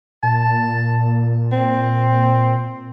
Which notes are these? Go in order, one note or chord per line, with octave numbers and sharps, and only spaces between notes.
A#2 A5
C4